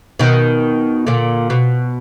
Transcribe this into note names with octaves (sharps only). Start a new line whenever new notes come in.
B2 D#3
A#2 D3
B2